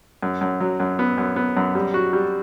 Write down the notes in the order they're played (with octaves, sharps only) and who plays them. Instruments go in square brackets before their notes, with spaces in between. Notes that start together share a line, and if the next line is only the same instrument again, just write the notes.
[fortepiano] F#2
F#2
F#3
F#2
B3
F#2
B3
F#2
G3
F#4
G3